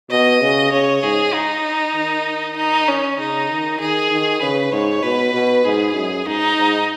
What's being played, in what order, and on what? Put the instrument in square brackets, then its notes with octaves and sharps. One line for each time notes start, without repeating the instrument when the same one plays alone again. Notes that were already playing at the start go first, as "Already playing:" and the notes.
[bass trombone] B2 [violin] D#5
[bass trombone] C#3
[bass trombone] C#3 [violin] C#5
[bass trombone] G#2 [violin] G#4
[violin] D#4
[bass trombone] D#3
[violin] D#4
C#4
[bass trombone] C#3 [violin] D#4
[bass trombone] D#3
[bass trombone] D#3 [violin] G#4
[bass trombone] D#3
[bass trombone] C#3 [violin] B4
[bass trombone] G#2 [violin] C#5
[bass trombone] B2 [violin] B4
[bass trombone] B2
[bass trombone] G#2 [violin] G#4
[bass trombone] F#2
[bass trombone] G#2 [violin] D#4
[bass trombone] G#2